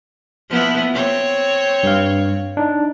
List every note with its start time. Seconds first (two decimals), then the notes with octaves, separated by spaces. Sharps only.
0.49 F3 B3 E4
0.94 C4 C#5
1.83 G2 F5
2.57 D4 D#4